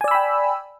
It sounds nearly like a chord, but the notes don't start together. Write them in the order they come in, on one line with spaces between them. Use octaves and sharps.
G#5 D5 E6 B5 G5